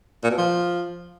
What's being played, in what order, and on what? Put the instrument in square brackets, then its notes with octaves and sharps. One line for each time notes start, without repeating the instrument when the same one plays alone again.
[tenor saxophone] A#2
B2
F3